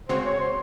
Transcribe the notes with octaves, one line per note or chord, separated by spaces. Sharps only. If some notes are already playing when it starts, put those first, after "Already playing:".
C#3 G#3 C4 F#4 C5 C#5
C#5
C5